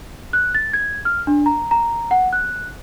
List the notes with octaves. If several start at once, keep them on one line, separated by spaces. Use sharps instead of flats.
F#6
A6
G#6
F6
D4
A#5
A#5
F#5
F#6